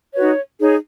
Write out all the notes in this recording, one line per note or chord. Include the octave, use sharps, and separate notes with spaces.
D#4 F#4 B4 C#5
D#4 G#4 C#5